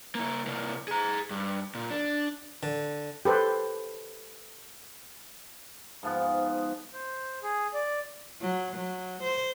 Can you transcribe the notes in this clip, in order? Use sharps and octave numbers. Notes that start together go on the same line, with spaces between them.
A#3 E4
C3 A#3
G#4 A#5
G2
A#2
D4
D3
G4 A4 B4 C5
G#2 F3 B3
C5
G#4
D5
F#3
F#3
C5